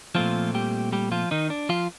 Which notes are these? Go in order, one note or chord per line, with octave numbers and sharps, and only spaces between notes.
A#2 F3 A3 C4 F4
G3 G4
G3 G4
F3 F4
D#3 D#4
D4
F3 F4